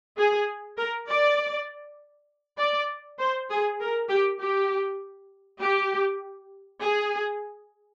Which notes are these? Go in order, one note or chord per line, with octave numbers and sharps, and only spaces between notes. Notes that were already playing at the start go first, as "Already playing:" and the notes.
G#4
A#4
D5
D5
C5
G#4
A#4
G4
G4
G4
G#4